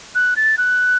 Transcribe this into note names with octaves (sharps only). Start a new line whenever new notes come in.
F#6
A6
F#6